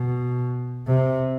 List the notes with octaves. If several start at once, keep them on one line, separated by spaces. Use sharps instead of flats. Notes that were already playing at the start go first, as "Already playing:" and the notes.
Already playing: B2
C3